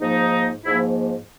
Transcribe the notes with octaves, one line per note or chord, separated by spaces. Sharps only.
G#2 F3 A#3 D#4
G#2 F3 A#3 E4